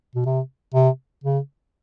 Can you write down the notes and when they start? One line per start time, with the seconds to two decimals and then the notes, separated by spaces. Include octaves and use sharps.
0.15 B2
0.25 C3
0.74 C3
1.24 C#3